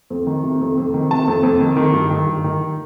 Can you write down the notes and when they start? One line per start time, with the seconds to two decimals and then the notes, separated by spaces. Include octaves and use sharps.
0.10 F2
0.27 D#3
0.43 C3
0.61 F2
0.78 F2
0.94 D#3
1.11 C3 A5
1.28 F2
1.43 F2
1.60 D#3
1.77 D#3
1.93 G2
2.10 D#3
2.26 G2
2.44 D#3